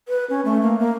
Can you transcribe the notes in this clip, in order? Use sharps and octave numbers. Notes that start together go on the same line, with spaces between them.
B4
C#4
A3
A#3
A#3